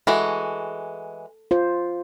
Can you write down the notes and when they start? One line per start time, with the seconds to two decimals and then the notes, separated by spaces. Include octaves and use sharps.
0.07 E3 G#3 F#4 A4
1.51 F4 C5